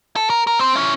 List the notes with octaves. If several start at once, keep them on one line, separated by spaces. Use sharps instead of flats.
A4
A#4
A#4
C4 C5
C#4 E4